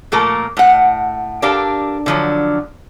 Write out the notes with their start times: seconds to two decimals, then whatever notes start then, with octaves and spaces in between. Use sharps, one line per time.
0.12 A#2 F3 A3 A#3 A4 A#4
0.57 A2 F#5
1.42 D4 G4 A4 A#4 F5
2.06 D3 F3 F#3